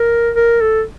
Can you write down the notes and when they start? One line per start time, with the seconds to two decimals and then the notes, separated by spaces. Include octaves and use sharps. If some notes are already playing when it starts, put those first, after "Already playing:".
Already playing: A#4
0.36 A#4
0.61 A4